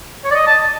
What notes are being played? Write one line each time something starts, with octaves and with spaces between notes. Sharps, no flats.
C#5
D5
D#5
A5